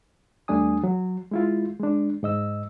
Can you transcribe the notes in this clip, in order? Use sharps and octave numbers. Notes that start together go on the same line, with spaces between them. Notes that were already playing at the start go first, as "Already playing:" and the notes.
D#2 G3 A3 D4 G#5 D#6
F#3
G#3 E4 F4
G#3 D4
G#2 D#5 E6